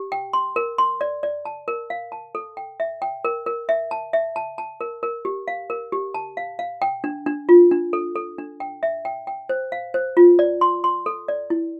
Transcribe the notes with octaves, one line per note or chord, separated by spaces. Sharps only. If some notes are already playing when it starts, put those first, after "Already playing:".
Already playing: G4
G5
C6
A#4
C6
D5
D5
A5
A#4
F5
A5
A4
G5
E5
G5
A#4
A#4
E5
A5
E5
A5
A5
A#4
A#4
G4
F5
A#4
G4
A5
F5
F5
G5
D4
D4
F4
D4
A4
A4
D4
G5
E5
G5
G5
C5
F5
C5
F4
D5
C6
C6
A4
D5
E4